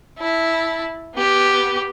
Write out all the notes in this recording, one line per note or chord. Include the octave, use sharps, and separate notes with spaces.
E4 A5
B3 G4